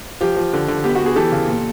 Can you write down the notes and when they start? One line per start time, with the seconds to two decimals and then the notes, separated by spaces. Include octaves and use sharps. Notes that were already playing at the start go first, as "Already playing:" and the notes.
0.21 F3 G4
0.36 F3
0.53 D3
0.68 D3
0.84 B3 G4
0.95 F#4
1.01 B3
1.06 F#4 G#4
1.16 E3 G4 A4
1.32 C#3
1.48 A#2